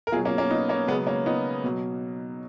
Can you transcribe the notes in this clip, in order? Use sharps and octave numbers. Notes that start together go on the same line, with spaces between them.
A#4
B2 F#3 F4 G#4
A#3 C#4
A#3 C#4
B3 D#4
A#3 C#4
C#3 F#3 G#3 B3
A#3 C#4
B3 D#4
B2 F#3